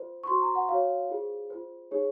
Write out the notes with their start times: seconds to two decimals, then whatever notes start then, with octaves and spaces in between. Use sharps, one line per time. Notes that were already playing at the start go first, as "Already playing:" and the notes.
Already playing: F4 C5
0.24 C#6
0.27 F#4 C5 C6
0.42 A#5
0.55 F#5
0.69 F#4 C#5 F5
1.09 F4 G#4 C5
1.50 F4 C5
1.91 D#4 G#4 C#5